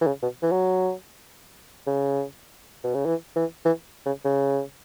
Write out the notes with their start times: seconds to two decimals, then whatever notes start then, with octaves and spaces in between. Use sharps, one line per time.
0.01 E3
0.07 C#3
0.22 B2
0.42 E3
0.52 F#3
1.87 C#3
2.84 B2
2.94 C#3
3.05 E3
3.36 E3
3.65 E3
4.06 C#3
4.25 C#3